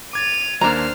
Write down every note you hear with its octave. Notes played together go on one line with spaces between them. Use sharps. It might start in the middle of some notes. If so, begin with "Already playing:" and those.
D6 G#6 A6 D#7 F7
D#2 A#3 D4 C5 A#5 F6